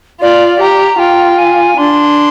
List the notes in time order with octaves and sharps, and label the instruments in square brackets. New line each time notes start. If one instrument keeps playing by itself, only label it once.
[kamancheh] F4 [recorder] D5
[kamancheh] G4 [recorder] A#5
[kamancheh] F4 [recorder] G5
[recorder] G#5
[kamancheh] D4 [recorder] C6